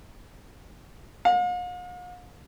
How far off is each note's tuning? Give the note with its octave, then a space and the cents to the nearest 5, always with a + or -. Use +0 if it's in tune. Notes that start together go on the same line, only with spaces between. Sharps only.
F5 +45